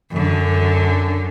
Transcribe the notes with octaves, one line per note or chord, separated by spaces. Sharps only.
F#2 D3